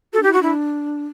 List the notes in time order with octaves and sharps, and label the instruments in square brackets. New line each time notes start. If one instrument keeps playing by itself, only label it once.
[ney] F#4 [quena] A4
[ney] D4
[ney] E4 [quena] G4
[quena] F#4
[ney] D4 [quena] E4